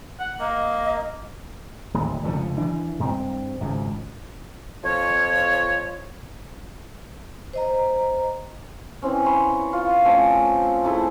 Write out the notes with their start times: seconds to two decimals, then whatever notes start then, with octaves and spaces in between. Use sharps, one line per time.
0.20 F#5
0.40 A#3 D#5
1.94 D1 D#2
2.23 F1 C#2 D3 F3
2.58 E3 D4
2.99 G2 C4
3.61 G#1 C#2 G#2
4.84 F2 F3 C#5
7.53 C5 D#5 A#5
9.02 E3 C4 C#4
9.26 C#5 B5 C6
9.73 F4
10.05 F3 A3 C4 C#4
10.84 A3 E4 G#4